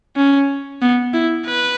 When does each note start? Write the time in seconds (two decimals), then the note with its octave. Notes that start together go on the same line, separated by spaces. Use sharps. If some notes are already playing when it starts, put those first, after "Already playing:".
0.16 C#4
0.81 B3
1.13 E4
1.46 B4